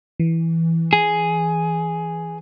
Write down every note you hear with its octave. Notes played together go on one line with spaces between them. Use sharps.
E3
G#4